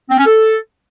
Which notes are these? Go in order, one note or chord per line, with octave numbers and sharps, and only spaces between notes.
C4
C#4
A4